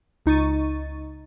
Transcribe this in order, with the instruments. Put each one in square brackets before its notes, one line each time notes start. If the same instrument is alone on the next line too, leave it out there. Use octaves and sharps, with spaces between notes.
[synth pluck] C#2 D#4 C#6 A6 D#7